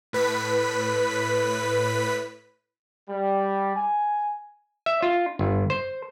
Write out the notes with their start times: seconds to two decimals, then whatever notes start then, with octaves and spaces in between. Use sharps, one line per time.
0.13 A2 B4 B6
3.09 G3
3.76 G#5
4.86 E5
5.02 F4
5.39 G1
5.70 C5